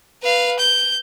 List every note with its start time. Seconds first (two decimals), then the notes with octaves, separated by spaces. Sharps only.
0.23 B4 F5
0.59 G6